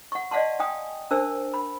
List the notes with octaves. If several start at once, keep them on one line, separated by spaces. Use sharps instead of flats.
F#5 C#6
D5 D#5 F5 F#5 A5 C6
F5 G5 G#5 D#6
D4 A#4 C5 A5 E6
B5